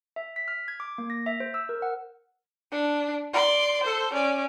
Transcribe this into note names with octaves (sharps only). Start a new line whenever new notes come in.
E5
B6
F6
G#6
D6
A#3
A#6
E5
C5
E6
A#4
F#5
D4
D5 C6
A4 C5
C#4 D5